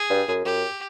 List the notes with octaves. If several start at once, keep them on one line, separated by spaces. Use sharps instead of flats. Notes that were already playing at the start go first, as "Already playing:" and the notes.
Already playing: G#4
G2
F#2
F#2 G4